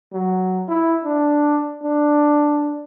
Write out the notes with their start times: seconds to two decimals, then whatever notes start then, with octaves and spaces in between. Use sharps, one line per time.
0.13 F#3
0.69 E4
1.05 D4
1.83 D4